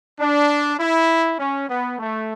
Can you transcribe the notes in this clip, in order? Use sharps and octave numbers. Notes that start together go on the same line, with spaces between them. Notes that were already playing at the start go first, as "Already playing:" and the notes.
D4
E4
C#4
B3
A3